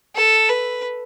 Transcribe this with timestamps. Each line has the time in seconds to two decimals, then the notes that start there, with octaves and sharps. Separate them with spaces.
0.16 A4
0.49 B4